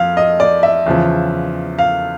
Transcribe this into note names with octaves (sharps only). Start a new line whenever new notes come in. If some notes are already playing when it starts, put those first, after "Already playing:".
Already playing: F2 F5
D#5
D5
E5
E2 C#3 F3
F5